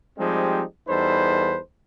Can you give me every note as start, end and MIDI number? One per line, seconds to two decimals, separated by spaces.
0.18 0.62 53
0.18 0.62 55
0.18 0.62 56
0.18 0.62 60
0.18 0.62 63
0.18 0.62 67
0.87 1.57 40
0.87 1.57 55
0.87 1.57 63
0.87 1.57 69
0.87 1.57 71
0.87 1.57 72